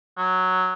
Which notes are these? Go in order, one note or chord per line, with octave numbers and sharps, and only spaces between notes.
F#3